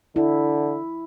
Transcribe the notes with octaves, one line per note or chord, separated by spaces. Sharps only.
D3 E4